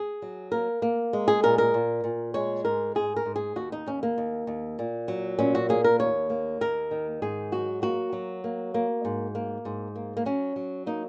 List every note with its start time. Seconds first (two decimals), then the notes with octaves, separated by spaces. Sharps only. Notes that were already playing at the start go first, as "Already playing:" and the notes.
Already playing: G#4
0.22 F#3
0.52 A#3 A#4
0.82 A#3
1.13 G#3
1.28 G#4
1.43 A#2 A#4
1.58 A#4
1.74 A#2
2.04 A#2
2.34 G#3 C#5
2.65 G#2 A#4
2.95 G#2 G#4
3.16 A#4
3.26 G#2
3.36 G#4
3.56 D#2 F#4
3.72 D#4
3.86 D#2 C#4
4.03 A#3
4.18 D#2
4.47 D#2
4.79 A#2
5.08 F#3
5.39 A#2 C#4
5.55 F#4
5.69 A#3 G#4
5.84 A#4
5.99 D#2 C#5
6.30 A#3
6.61 D#2 A#4
6.91 D#3
7.22 G#2 G#4
7.52 F#3 F#4
7.82 A#3 F#4
8.13 F#3
8.44 A#3
8.74 A#3
9.05 G#2
9.35 A#3
9.65 G#2
9.96 A#3
10.17 A#3
10.26 F#3 C#4
10.56 F#3
10.86 A#3 D#4